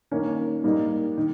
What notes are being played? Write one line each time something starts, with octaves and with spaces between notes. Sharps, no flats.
G2 D#3 A#3 C#4
G#2 G3 A#3 D#4
D#3